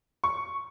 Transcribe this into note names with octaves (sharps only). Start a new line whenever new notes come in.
C#6